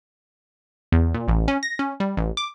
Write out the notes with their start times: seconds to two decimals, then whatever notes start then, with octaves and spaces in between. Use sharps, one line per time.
0.92 E2
1.14 A#2
1.28 A1
1.48 C#4
1.63 A#6
1.79 C#4
2.00 G3
2.17 A1
2.37 D6